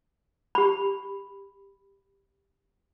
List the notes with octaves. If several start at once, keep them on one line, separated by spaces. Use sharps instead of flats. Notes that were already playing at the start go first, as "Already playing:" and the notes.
G4 B5